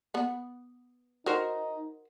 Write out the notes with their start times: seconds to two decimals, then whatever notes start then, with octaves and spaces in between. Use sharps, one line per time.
0.14 B3 F#5
1.26 D#4 F#4 A#4 C5